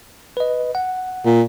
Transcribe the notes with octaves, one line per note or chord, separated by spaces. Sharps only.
B4 D#5
F#5
A#2